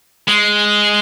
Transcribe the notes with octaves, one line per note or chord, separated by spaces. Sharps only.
G#3